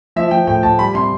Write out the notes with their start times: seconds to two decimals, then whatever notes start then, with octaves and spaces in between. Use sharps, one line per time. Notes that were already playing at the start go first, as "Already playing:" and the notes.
0.16 F3 E5
0.31 F3 G5
0.47 A2 G5
0.63 A2 A5
0.79 G3 B5
0.95 C3 C6